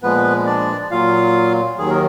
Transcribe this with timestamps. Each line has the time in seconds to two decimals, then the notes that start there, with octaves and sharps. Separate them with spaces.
0.03 A#2 F3 G#3 B3 B4
0.46 D4 D5
0.91 A#2 F#3 F4 F5
1.79 D#2 D#3 F#3 G#4
1.90 A#4